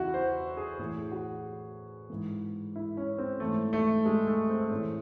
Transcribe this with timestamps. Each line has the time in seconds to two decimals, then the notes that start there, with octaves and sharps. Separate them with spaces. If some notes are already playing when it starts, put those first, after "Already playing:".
Already playing: E2 C#3 E3 E4 F#4
0.14 C5
0.57 G#4
0.79 A2 E3 G#4
1.11 F#4
2.10 G#2 E3
2.76 E4
2.97 C#4
3.18 C4
3.40 G#2 E3 A3
3.73 A3
4.05 G#3
4.27 A3
4.49 C4
4.70 A2 E3 C#4